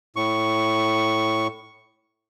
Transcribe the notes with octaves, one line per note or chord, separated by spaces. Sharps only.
A2 C#6